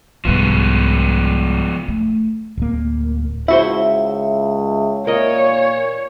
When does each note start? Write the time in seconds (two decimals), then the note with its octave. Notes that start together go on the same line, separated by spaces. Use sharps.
0.25 C2 G#2 F3 B3
1.88 A3
2.57 D1 A#3
3.48 C#2 E4 F#4 C5 E5
5.07 A#2 A#4 C#5 D#5